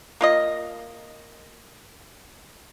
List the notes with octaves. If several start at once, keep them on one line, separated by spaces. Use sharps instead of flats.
A#3 F4 D#5